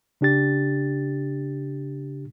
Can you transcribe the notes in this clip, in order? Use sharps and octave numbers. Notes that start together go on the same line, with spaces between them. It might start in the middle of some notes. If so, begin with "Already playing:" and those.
C#3 D4 G4 A6